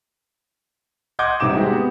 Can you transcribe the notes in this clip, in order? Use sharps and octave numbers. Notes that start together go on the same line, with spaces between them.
D#5 F#5 C6 D6 G6 G#6
G#1 G2 C3 D#4 D6 E7
G#3 C4 D#4 F#4 G4
B3